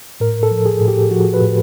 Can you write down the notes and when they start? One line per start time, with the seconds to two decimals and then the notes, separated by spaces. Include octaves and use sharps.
0.20 A2 A#4
0.43 A4
0.51 F3
0.66 G#4
0.80 A2
0.88 G4
1.11 F3 F#4
1.34 B4
1.41 A2